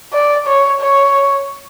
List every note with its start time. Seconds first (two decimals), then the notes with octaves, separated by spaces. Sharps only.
0.13 D5
0.47 C#5
0.80 C#5